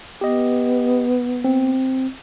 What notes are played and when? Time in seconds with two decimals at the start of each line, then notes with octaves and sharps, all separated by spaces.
0.21 B3 G4 D#5
1.44 C4